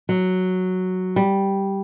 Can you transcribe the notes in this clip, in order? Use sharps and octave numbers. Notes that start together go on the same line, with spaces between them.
F#3
G3